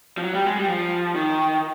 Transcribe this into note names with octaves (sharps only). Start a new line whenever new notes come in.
F3
F#3
G3
G#3
G3
F3
D#3